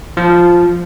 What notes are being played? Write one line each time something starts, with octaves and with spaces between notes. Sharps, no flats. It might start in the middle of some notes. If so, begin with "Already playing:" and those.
F3